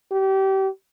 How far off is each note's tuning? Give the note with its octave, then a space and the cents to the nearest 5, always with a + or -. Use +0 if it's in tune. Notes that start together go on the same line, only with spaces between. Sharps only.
G4 -30